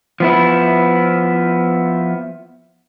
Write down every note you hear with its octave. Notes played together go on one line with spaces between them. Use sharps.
F3 B3 E4